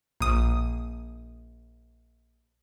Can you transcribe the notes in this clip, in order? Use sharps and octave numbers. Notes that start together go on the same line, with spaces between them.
A#1 D#6